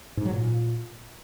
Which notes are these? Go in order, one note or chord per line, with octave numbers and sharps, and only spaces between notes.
G#2
F#3
A#2